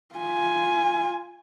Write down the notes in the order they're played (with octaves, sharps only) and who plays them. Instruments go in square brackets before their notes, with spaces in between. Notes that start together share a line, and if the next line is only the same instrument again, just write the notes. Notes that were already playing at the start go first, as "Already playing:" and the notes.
[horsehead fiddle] F4 G#5